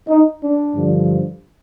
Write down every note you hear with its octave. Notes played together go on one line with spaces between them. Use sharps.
D#4
D4
G2 D3 F3